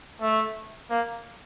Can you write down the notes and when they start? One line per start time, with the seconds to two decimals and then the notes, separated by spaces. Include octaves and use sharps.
0.21 A3
0.90 A#3